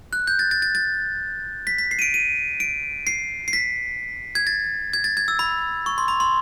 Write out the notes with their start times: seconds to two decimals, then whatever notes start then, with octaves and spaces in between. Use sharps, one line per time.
0.13 F#6
0.27 G6
0.39 A6
0.51 A6
0.62 A6
0.75 A6
1.67 B6
1.78 B6
1.91 C7
1.99 D#7
2.02 D7
2.14 D#7
2.60 D7
3.07 C7
3.48 C7
3.53 B6
4.35 G#6
4.47 A6
4.93 G#6
5.04 A6
5.17 G#6
5.28 E6
5.39 B5
5.86 C#6
5.98 C6
6.08 B5
6.20 C6